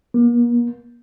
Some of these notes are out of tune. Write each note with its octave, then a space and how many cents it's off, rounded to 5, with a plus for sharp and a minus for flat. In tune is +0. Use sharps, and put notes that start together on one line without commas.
A#3 +40